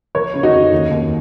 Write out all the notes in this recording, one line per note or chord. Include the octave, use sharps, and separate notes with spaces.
F3 A#4 C#5
C#3
D#4 F#4
F2
D#2
D#2